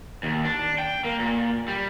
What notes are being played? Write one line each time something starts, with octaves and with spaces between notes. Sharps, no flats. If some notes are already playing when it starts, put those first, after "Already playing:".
D#2
D4
G5
A#3
A#2
G3